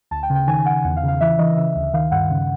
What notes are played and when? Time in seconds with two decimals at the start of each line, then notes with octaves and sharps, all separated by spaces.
0.11 D2 A5
0.23 G5
0.30 C#3
0.35 G5
0.47 D#3 G#5
0.65 D#3 F#5
0.84 E2 F#5
0.96 F5
1.03 C#3
1.08 F5
1.21 E3 E5
1.39 E3 D#5
1.57 C#3 E5
1.75 D2
1.93 D#3 F5
2.11 G2 F#5
2.30 C#3